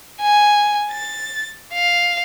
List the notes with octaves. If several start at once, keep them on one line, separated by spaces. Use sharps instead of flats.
G#5
A6
F5